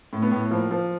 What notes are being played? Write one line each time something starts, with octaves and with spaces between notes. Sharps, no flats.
A2
B3
A2
F3 A#3
F3